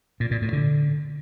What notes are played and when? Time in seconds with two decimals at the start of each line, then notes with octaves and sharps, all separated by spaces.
0.20 A#2
0.31 A#2
0.42 A2
0.53 D3